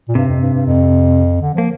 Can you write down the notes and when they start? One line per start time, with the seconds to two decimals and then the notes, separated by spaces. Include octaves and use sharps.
0.08 A#2
0.15 G2 C3
0.28 F2
0.40 G2
0.54 G2
0.66 F2
1.41 D3
1.54 F3 A#3